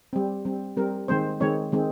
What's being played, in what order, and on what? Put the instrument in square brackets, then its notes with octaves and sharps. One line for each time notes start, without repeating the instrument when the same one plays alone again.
[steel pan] G3 C4
G3 C4
G3 C4 A#4
D#3 G#3 C4 C5
D#3 G#3 C4 C#5
D#3 G#3 C4